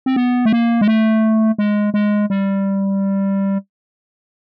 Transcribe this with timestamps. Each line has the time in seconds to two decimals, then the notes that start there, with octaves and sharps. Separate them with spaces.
0.06 C4
0.16 B3
0.45 A3
0.53 A#3
0.81 G#3
0.88 A3
1.58 G#3
1.94 G#3
2.30 G3